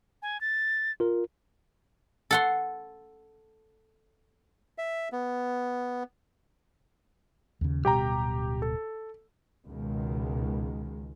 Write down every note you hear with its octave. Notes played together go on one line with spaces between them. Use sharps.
G#5
A6
F4 A#4
A4 F#5 C6
E5
B3
D#2 C#3
D1 B2 G3 G4 G5 A#5
A4
C#2 B2 D#3 G#3